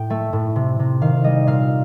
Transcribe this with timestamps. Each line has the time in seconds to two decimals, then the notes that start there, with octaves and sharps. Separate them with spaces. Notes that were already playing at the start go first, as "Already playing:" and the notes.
Already playing: A2 G5
0.10 A3
0.33 A2
0.56 C3
0.79 C3
1.02 D#3 F5
1.24 G3 D#5
1.47 A#2 F5